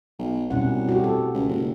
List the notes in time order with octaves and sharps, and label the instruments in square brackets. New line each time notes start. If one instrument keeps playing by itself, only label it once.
[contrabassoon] B1
[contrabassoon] C2 [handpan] B2 C#4 F#5
[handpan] F#4 G4
A4
[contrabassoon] C#2
F#1